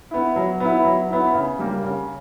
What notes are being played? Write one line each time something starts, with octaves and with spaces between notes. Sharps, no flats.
B3 E4
F#3
B3 E4
F#3
B3 E4
C#3
G3 A#3
C#3